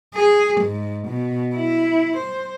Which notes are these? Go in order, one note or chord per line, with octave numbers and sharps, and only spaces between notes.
G#4
G#2
B2
E4
C5